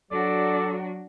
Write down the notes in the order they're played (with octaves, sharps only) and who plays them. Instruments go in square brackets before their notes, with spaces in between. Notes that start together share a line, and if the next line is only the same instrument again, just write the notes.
[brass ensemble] F#3 [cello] D4 F#4 [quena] A4 [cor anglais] D5